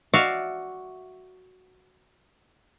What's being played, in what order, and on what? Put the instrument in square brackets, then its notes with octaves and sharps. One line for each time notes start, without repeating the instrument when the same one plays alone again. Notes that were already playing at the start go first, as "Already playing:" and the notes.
[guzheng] F#4 D5 E5 F5